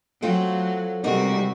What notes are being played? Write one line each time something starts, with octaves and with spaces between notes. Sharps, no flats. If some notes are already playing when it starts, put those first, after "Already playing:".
F#3 A3 C4 F4
C3 G3 G#3 D#4 F#4 A#4 D5